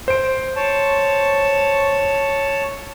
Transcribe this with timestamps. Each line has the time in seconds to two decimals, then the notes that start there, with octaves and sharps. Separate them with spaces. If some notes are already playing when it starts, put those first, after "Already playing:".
0.08 C5 D7
0.56 C#5 A5